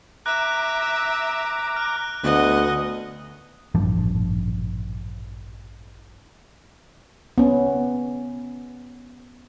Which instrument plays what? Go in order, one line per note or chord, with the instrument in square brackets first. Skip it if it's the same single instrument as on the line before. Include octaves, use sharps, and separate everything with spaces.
[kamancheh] E5 [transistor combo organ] A#5 D6 [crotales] F#6
[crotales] F6 F#6
[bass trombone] D2 [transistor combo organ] B3 [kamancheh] D#5 F#5
[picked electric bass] D#1 A1 G2 F3
[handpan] B3 C#4